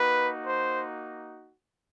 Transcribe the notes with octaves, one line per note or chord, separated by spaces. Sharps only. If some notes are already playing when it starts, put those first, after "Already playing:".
Already playing: A#3 D#4 F#4 B4
C5